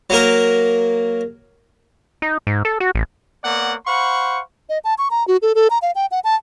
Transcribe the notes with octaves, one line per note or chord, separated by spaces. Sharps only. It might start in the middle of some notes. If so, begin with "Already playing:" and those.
F#3 A#3 A#4
D#4
G#2
A4
F#4
A1
A#3 B3 C#5 D5 F#5
C5 F5 F#5 B5 C#6
D#5
A5
C#6
A#5
F#4
A4
A4
A#5
F5
G5
F#5
A5